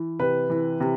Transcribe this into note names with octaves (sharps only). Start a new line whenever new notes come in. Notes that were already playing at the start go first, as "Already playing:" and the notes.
Already playing: E3
C3 B4
E3
C3